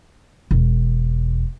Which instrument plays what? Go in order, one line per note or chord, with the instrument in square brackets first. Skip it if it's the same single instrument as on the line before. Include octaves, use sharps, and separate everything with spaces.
[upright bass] E1